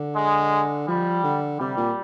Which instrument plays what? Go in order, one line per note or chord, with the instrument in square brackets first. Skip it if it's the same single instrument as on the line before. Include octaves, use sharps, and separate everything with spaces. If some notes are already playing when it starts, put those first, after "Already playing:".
Already playing: [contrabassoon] D3
[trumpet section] G#3
[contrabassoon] F3 [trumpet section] G3
[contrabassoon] D3
[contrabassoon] C3 [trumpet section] G3
[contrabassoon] A#2